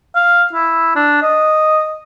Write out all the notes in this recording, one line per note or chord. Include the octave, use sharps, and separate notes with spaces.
F5
E4
D4
D#5